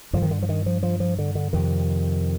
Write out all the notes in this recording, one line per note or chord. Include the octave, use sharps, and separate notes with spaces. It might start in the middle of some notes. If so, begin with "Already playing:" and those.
G2 D3 F3
D#3
D3
F3
D#3
F3
F3
F3
D3
D3
F2 C3 D#3